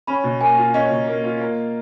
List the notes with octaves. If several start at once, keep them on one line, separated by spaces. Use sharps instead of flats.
C#4 B5
B2
A#3 G#5
F4
C#4 D#5
B2
A#3
F4
A#3